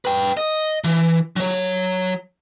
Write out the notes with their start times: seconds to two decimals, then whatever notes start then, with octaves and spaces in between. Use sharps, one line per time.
0.05 B4 G5
0.37 D#5
0.84 E3
1.36 F#3 C#5